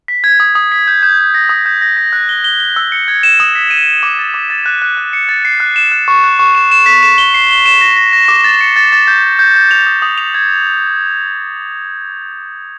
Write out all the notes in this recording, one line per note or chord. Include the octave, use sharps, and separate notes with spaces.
B6
G#6
D#6
D#6
B6
G6
G6
G6
A#6
D#6
G6
A#6
A#6
F#6
G7
G7
G7
E6
C#7
G#6
E7
D#6
B6
D#7
D#7
D6
A6
D6
A6
F#6
F#6
F#6
C#7
A6
C7
F#6
E7
F#6
C#6
F#6
C#6
E7
E7
B6
E7
G7
C7
G7
E7
A#6
A#6
A#6
D6
A6
C#7
A6
A6
G6
G6
G6
G6
F7
D#6
D#6
F7
G#6